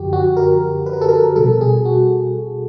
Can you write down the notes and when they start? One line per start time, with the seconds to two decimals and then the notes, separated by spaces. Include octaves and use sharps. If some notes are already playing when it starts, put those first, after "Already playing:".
Already playing: F#2 D3 F3 F#4 G4
0.13 F#4
0.37 A#4
0.86 B4
0.93 A#4
1.01 A4
1.09 A#4
1.36 B2 G3 A4
1.61 G#4
1.85 F#4